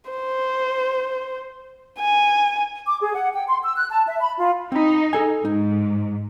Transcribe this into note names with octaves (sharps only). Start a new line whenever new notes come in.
C5
G#5
D6
G#4
F#5
G5
C6
E6
F#6
A5
E5
B5
F4
C4 D#4 B5
G#4 A4 G#5
G#2 D#4